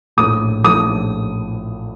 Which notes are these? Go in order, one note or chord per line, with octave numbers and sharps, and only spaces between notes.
A#1 A2 F3 D#6
A#1 A2 F3 D#6